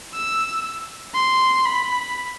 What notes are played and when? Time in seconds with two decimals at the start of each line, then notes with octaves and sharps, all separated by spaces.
0.14 E6
1.15 C6
1.65 B5